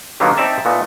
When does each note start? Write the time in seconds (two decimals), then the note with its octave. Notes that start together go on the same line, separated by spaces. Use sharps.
0.20 D3 D#3 F#3 G3 A#3 B3
0.37 C4 D#4 D5 E5 A5
0.65 A#2 A3 B3 D#4